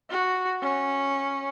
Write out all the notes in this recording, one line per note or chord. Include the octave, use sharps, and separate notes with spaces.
F#4
C#4